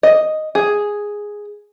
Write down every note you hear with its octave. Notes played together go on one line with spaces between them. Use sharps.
D#5
G#4